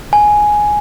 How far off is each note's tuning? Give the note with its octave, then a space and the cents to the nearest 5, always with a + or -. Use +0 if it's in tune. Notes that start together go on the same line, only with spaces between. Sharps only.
G#5 +5